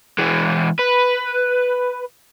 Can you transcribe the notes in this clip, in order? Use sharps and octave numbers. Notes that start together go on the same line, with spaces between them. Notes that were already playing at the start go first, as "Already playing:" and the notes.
E3 G#3
B4